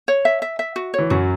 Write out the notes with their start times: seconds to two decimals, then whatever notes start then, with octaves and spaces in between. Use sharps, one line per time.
0.08 C#5
0.25 E5
0.42 E5
0.59 E5
0.76 F#4
0.94 E3 C#5
1.10 F#2 F#3 F#4